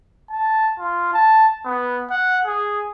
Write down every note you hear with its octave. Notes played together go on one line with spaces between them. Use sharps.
A5
F4
A5
B3
F#5
G#4